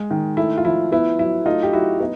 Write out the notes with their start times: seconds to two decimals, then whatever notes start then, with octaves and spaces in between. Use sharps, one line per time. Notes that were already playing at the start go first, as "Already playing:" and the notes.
Already playing: G#3
0.11 D#3
0.37 A3 E4
0.57 F4
0.65 F3 E4
0.92 B3 E4
1.19 F#3 E4
1.46 A3 D#4 F4
1.63 G4
1.73 F#3 E4 F#4
2.00 B3 D#4